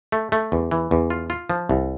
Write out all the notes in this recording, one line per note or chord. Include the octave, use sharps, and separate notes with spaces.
A3
A3
E2
E3
E2
F4
F4
F3
C2